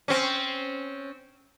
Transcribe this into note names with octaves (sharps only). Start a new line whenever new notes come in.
C4 C#4